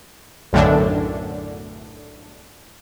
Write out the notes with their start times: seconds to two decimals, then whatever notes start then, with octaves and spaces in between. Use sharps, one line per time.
0.53 B1 F#2 A2 D3 D4